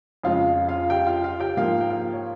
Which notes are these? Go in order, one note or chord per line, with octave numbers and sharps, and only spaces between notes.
F2 C#3 G#3 F4 F5
F4 F5
G4 G5
F4 F5
F4 F5
G4 G5
G#2 F3 A#3 F4 F5
G5
F4 F5
C#5